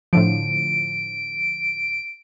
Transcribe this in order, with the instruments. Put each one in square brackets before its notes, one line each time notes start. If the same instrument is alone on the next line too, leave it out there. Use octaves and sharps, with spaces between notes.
[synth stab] A2 D3 F3 [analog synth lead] D7